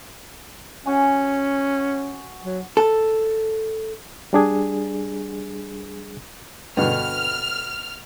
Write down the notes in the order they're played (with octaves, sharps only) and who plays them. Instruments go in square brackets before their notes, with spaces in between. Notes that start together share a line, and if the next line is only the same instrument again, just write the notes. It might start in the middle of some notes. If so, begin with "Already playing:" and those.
[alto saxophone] C#4 [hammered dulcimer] F#4 G#5
[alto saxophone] F#3
[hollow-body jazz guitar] A4
[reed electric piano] G3 D4 G#4
[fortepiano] G2 B2 D3 [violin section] F6